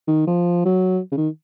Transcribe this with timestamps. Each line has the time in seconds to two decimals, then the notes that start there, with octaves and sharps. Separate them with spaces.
0.07 D#3
0.27 F3
0.65 F#3
1.12 C#3
1.17 D#3